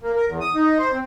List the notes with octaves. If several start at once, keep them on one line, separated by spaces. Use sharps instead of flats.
A#3
A#4
E2
D#6
D#4
C5
C4